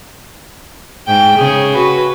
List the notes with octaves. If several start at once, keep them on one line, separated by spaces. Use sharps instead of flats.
G#2 G5
C#3 G#4
F#4 B4